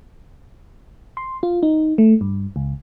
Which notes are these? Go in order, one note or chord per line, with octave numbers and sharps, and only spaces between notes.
C6
F4
D#4
A3
G2
C#2